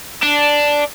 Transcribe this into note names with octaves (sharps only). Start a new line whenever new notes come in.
D4